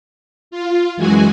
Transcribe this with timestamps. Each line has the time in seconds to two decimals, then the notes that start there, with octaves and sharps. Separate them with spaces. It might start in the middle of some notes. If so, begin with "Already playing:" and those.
0.51 F4
0.97 F#2 E3 G#3 F#4 G#5